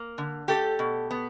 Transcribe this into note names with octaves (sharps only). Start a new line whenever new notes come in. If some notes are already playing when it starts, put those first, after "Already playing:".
Already playing: A#3
D3
A3 G4 A4
B2
B3